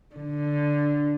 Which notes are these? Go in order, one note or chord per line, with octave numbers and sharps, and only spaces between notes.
D3